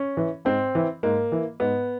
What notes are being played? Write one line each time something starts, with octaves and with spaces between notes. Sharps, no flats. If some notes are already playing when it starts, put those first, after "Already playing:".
Already playing: C#4
E3
G#2 C4
E3
G#2 A#3
E3
G#2 B3